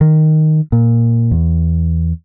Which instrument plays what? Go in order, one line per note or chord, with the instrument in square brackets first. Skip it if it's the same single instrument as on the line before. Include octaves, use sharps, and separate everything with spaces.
[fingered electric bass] D#3
A#2
E2